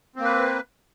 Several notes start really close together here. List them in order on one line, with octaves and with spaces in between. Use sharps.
C4 A#3 B4